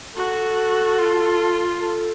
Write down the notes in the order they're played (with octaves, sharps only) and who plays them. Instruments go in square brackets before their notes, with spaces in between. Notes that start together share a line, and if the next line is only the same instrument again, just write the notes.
[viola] F#4 [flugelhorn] A4
[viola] F4
[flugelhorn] A4